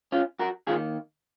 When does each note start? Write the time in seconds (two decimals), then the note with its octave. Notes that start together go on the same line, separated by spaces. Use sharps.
0.12 C#4 F4
0.39 F#4 A#4
0.67 D#3 A#3 F4 G#4